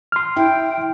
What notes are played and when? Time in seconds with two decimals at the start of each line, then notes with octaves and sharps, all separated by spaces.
0.12 C6 F6
0.36 E4 G5